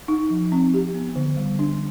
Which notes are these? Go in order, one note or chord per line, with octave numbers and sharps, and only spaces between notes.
D#4
F3
C4
G4
B3
D3
G3
D4